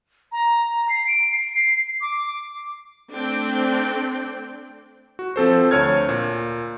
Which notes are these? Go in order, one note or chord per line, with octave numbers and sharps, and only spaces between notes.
A#5
C7
D7
C7
D6
A3 C4 D4 G5
F#4
F3 C4 A4 C5
D2 C#5 A5 F6 G#6
A#2